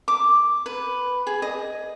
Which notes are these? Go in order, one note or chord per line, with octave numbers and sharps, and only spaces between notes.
D6
B4
G#4
D#5